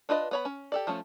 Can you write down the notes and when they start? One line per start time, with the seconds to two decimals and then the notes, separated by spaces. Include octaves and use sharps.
0.09 D4 F4 B4 D#5
0.31 B3 C#5 B5
0.45 C#4
0.72 G4 A4 D5
0.87 F3 A3 C#4